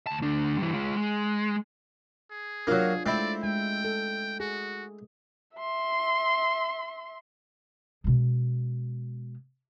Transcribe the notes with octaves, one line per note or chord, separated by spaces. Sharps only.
D2 A5
D2 D4
G2 E3
G#3 F4
G#3
G#4
F#3 A#3 D4 F4 C#5
G#3 A3 C4 E4 D5
G#3 G5
A4
F#4 G#4
E5 C6
B2 G#3